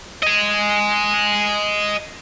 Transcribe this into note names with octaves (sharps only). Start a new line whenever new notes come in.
D#5 G#5